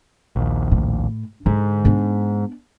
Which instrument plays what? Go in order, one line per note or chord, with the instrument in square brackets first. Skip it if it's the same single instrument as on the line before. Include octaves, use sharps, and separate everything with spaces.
[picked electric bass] A#1 D#2
[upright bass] A2
[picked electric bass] G#2 [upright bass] D3
[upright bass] B3 D4